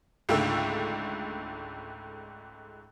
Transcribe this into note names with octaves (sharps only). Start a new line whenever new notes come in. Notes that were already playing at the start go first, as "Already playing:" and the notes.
C#2 G#2 D3 A3 G5 E6